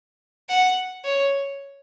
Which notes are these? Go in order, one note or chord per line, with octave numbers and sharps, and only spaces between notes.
F#5
C#5